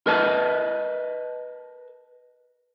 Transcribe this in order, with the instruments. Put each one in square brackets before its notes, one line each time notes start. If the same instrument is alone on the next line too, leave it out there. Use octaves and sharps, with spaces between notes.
[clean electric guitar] A#4 B4 D#5 A5